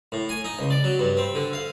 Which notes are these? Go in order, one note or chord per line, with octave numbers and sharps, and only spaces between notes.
A2
G#5
D#4
C#2
D5
F#3
G2
C4
D3
F5